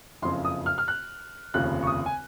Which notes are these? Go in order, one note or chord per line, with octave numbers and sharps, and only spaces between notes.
F#1 F2 C#3 C6
D#6
F6
F6
F#6
F1 D#2 C#3 F3 F#6
C#6
D#6
G#5